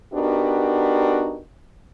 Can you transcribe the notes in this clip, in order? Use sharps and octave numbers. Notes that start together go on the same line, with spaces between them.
B3 D4 D#4 F#4 G4 A#4